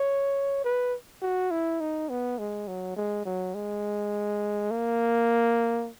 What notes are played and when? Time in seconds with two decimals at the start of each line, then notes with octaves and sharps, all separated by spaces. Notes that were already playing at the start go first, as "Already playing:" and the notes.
Already playing: C#5
0.64 B4
1.22 F#4
1.51 E4
1.80 D#4
2.09 B3
2.39 G#3
2.68 F#3
2.96 G#3
3.25 F#3
3.55 G#3
4.71 A#3